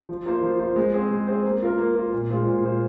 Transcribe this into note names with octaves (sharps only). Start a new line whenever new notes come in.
F3
A#3 F4 C5
F3
A#3 F4 C5
G#3
C4 G#4 C5
G#3
C4 G#4 C5
A#3
F4 A#4
A#3
F4 A#4
A#2
G#3 F4 C5
A#2
G#3 F4 C5